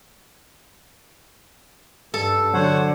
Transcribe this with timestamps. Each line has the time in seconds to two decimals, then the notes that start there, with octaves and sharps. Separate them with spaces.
2.14 G2 A4
2.54 D3 F#3 C5 C#5 F#5